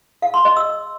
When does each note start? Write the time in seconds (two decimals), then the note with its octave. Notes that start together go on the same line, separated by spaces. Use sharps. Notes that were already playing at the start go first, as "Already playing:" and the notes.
0.22 F5
0.34 C6
0.45 D#5
0.56 E6